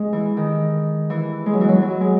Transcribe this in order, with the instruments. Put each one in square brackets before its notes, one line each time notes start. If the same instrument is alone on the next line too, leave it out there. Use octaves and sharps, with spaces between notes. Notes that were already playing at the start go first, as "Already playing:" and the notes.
Already playing: [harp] G#3
E3
D#3
E3
G#3
F#3
E3
F#3
F#3
G#3